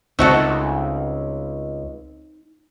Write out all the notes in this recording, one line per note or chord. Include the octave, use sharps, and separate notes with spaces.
C#2 A3 C4 D#4 F#4 A4